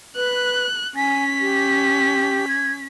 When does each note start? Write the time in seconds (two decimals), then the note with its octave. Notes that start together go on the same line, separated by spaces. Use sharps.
0.16 B4 F#6
0.96 C#4 G#5 B6
1.40 G4
2.48 G#6